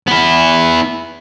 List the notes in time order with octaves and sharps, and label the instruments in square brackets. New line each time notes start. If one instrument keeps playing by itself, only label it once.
[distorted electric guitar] B3 E4